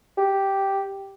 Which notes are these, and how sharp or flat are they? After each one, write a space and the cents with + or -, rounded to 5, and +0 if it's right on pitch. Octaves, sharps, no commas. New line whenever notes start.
G4 -5